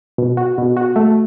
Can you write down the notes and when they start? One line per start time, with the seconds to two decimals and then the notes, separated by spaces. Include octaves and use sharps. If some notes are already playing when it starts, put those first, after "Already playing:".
0.18 B2
0.37 F#4
0.58 B2
0.77 F#4
0.96 A3